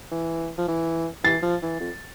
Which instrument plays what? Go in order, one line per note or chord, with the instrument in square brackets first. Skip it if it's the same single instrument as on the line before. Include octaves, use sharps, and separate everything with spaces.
[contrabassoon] E3
F3
E3
[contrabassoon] E3 [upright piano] A6 C7
[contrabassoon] F3
E3
F2